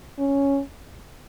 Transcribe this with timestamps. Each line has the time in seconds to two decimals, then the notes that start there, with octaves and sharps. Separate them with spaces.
0.19 C#4